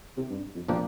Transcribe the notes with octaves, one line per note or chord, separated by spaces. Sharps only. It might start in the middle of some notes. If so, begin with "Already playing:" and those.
C3
G2
F2
A#2 F3 A#3 D4 G4